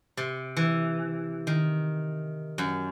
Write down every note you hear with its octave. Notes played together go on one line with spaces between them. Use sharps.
C3
E3
D#3
F#2